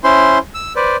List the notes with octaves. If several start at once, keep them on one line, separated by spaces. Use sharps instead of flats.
C#4 E4 C5 C6
E6
B4 C5 D5